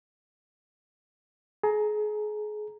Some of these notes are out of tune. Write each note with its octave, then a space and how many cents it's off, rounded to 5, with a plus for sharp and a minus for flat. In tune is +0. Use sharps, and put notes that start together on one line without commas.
G#4 +30 A#5 +0